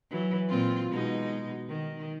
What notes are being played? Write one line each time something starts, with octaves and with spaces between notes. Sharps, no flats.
E3 F#3
A#2 C4 F4
B2 G#3 D#4
D#3